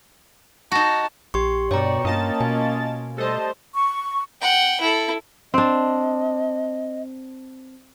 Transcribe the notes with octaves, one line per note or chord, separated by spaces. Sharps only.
D#4 F#4 A5
A#1 G4 C6 C#6
G2 B2 C#5 D5 G5 A#5 C#6
G2 A#3 C#4 F4 D#5 A5 A6
B2 G#5
G3 A3 A4 C5 D#5 A5
C#6
F#5 G5
E4 A4
C4 D4 D#5